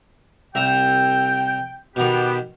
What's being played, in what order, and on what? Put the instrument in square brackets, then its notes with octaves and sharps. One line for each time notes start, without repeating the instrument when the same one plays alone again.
[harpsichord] C2 E5 A#5 [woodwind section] G5
[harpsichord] B2 D#3 [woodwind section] B3 G4